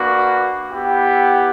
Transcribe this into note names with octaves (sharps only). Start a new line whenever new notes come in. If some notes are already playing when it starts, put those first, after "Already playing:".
Already playing: A#3 D4 F#4 B4
B3 E4 G4